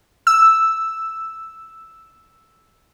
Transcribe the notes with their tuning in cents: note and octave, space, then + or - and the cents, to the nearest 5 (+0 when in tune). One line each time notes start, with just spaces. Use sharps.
E6 +0